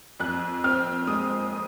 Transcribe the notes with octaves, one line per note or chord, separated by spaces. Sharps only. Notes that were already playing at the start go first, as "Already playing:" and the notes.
F2 F#6
C4 F6
G#3 D#6
D#6